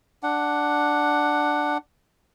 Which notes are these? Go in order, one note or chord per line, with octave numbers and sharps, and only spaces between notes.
D4 F#5